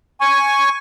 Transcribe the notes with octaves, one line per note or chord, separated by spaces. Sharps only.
G#5 C#6